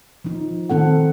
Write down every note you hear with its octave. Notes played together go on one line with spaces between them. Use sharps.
F3 D#4
D#3 C4 A4 F#5